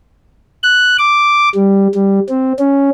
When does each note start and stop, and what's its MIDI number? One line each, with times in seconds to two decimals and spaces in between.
0.63 0.97 90
0.99 1.49 86
1.55 1.88 55
1.95 2.20 55
2.29 2.53 60
2.59 2.90 61